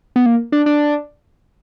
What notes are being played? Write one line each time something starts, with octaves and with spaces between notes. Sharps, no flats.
B3
A#3
D4
D4